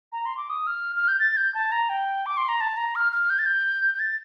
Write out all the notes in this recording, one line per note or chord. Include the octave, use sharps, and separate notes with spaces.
A#5
C6
D6
D#6
F6
F6
G6
A6
G6
A5
A#5
G5
D6
C6
A#5
A5
A#5
F6
F6
G6
A6
G6
G6
A6